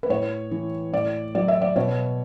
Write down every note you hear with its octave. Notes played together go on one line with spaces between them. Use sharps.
B4
A2 C#5
E3
A2 D5
F#3 D5
E5
D5
B2 C#5